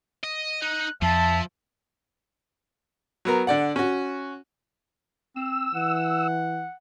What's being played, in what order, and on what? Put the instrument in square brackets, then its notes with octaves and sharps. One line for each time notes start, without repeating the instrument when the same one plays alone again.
[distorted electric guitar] D#5
[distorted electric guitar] D#4 [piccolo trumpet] F#6
[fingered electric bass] F2 [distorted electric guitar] F3 [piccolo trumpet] E5 [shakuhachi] A5
[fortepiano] F#3 B3 A#4
D3 D5 F#5
C#4 F#4
[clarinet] C4 [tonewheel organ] E6
[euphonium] E3 [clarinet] F#5